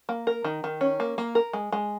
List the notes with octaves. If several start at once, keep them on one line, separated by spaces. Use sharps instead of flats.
A#3
A#4
D#3
D#3
C#4
A#3
A#3
A#4
G#3
G#3